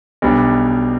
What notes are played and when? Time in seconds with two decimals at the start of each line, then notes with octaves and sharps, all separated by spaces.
0.22 B1 B2 G3 D4